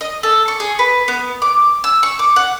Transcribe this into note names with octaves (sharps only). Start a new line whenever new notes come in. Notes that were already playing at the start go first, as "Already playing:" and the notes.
D#5
A4
C#6
G#4
B4
B3
D6
E6
C#6
D6
F#5